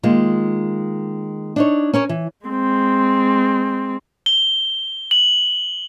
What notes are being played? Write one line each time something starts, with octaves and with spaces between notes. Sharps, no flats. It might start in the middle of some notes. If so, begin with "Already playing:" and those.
D#3 G#3 A#3 F4
D4 D#4 C#5
C#4 A#4 C#5
E3
G#3 C4
G7
F#7